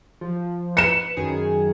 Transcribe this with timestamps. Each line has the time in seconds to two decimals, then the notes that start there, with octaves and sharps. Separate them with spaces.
0.21 F3
0.77 B4 C#7 E7
1.17 F#2 D#3 G#4